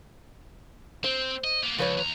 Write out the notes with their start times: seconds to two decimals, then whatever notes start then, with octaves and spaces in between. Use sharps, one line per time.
1.04 C4 C5
1.44 D#5
1.63 A#3 B3
1.79 C#2 F3 B4 C#5
1.97 D#2 A#5